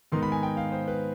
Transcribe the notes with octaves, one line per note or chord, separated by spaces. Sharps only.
G#2 D#3 B3 D#4 C6
B5
G#5
G5
F5
C5
B4